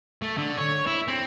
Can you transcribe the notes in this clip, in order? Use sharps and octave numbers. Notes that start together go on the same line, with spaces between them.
A3
D3
C#5
E4
C4